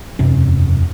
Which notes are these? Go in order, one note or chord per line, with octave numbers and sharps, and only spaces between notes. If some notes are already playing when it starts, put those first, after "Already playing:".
E1 F#2 C3 C#4